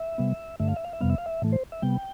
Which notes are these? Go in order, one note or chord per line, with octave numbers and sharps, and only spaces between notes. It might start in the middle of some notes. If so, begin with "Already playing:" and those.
Already playing: E5
C3 G3 B3
G2 D3 A3 E5
F5
E5
F5
E5
F2 C3 G3 B3 F5
E5
F5
E5
A2 E3 A3
C5
E5
C3 G3 B3 G5